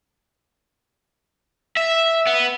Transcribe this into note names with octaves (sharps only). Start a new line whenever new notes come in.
E5
B3